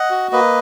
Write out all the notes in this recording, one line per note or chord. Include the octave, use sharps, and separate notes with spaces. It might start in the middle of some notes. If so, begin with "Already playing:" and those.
Already playing: D#5 F#5
F#4
A#3 B4 D#5